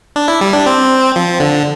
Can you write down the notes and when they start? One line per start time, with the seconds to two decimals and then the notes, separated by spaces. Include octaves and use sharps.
0.16 D4
0.28 E4
0.41 G3
0.53 D4
0.66 C4
1.16 F3
1.40 D3